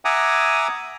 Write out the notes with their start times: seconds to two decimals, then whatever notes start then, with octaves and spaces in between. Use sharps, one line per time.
0.05 E5 F#5 G#5 A#5 D6 D#6